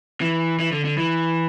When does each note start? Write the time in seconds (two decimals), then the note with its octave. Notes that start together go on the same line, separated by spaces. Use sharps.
0.21 E3
0.59 E3
0.72 D3
0.84 D3
0.98 E3